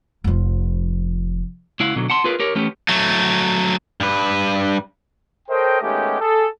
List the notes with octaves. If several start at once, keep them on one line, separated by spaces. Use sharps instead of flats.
F1 F3
C#2 E4 F5 F#5
B2 D3 F#3
F#5 A5 C6
F4 G#4 A#4 B4 F5
G4 A#4 C#5
E3 A3 B3 C#4 G4
F#3 A3
G2 B4
A4 A#4 C5 C#5 D#5 G5
D#3 G#3 A3 B3 C#4 G4
G#4 A4